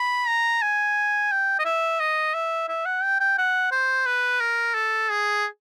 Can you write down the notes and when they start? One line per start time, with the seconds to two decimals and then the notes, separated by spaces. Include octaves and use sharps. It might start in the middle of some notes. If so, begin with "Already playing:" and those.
Already playing: B5
0.27 A#5
0.62 G#5
1.31 G5
1.59 D#5
1.65 E5
2.00 D#5
2.34 E5
2.68 E5
2.85 F#5
3.03 G5
3.20 G5
3.38 F#5
3.71 C5
4.06 B4
4.40 A#4
4.74 A4
5.09 G#4